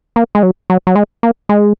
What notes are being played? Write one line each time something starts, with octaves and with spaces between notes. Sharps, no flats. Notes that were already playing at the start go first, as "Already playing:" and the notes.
A#3
G#3
F#3
F#3
F#3
G#3
A#3
G#3